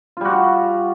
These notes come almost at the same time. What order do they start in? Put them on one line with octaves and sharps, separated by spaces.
F4 G3 F#4